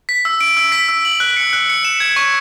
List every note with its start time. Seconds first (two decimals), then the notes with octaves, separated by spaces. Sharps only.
0.09 B6
0.25 E6
0.41 D7
0.57 E6
0.72 B6
0.88 E6
1.05 F#7
1.20 F#6
1.37 C#7
1.53 F#6
1.70 C#7
1.85 E7
2.00 G#6
2.16 C#6